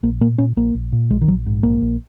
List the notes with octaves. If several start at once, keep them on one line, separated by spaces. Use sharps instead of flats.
A#1 A#3
A#2 A#3
A#2 C#4
A#1 A#3
A#1
A#2
A#1 G#3
D#3
A#1 F#3
G#2
A#1 A#3
A#1